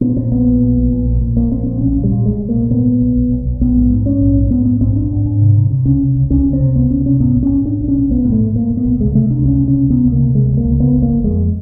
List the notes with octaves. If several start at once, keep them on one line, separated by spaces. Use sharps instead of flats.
A#2 B3
A#2 C4
A#1 B3
A#2
A#1
A#2
A#1
A#2
A#2
A#1 A#3
A#1 C4
A#1 C4
B1 C#4
A#2
G3
A#2
B1 G#3
B1
A#3
A#2
A#2 B3
A#2
B1
B1
B1
B1
A#1 B3
G#2
G#2
G#2 C#4
A#1
G#2
G#2 B3
G#2 B3
A#1 C4
A#1 D4
G#2
G#2
C3
C3
C3
C#2 C#4
C3
C#2
C#2 C#4
C#2
C4
C3
C#2 B3
C#2 C#4
C3 C#4
A2 B3
B1
C#4
A2
A2 D4
B1
C#4
B1
B1 B3
A2
A3
A2
A2 A#3
A2
B3
B1
C#2 G#3
C3 A3
C3 D4
C#2 C#4
C3
C#4
C3
C3 B3
C#2
A#3
C3
C3 G#3
C#2
A#3
C#2
C#3 B3
G1
A#3
G1
F2 G#3